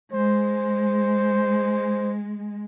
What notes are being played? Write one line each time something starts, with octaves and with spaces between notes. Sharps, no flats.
G#3 C5